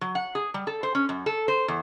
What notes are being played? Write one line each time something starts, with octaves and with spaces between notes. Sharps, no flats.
F#3
F#5
G#4
G3
A4
C5
C#4
F#2
A4
C5
E2